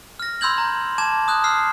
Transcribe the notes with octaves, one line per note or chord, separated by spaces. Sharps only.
F6 A#6
B5 C6 E6 G6 G#6 F#7
A#5
A5 D6 G#6 E7
D#6 F#6 G6
E6 F6 C7